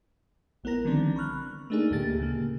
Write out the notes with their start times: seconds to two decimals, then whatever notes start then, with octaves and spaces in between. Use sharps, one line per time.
0.64 A#1 B3 E4 A#4 A#6
0.85 D3 D#3 F3 G3 C4 D4
1.16 B5 C#6 F6 F#6
1.70 A3 A#3 D4 D#4 G#4
1.91 D2 A2 D3 A#3 G4 A6
2.20 C#3 A#3